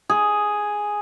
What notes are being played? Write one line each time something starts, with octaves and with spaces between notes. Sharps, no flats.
G#4